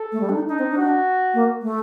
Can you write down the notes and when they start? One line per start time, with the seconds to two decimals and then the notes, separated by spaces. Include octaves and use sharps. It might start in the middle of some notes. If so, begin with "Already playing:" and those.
Already playing: A4
0.12 A3
0.21 G3
0.29 D4
0.35 D#4
0.49 D4 D#4
0.59 C4
0.68 D4
0.78 F#4
1.34 A#3
1.62 A3